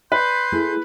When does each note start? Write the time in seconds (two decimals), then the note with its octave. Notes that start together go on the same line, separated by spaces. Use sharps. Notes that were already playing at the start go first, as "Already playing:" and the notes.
0.12 B4 D5 C6 G6
0.52 A3 E4 G#4